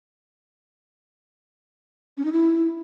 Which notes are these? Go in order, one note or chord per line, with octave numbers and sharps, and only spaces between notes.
C#4
D#4
E4